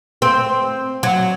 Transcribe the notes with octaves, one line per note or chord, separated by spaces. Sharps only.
C4
F#3